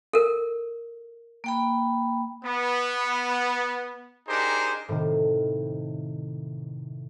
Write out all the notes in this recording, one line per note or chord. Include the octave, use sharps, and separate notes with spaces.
A4 A#4
A#3 G5 B5
B3
D4 D#4 G4 G#4 A#4 C5
A2 C3 D#3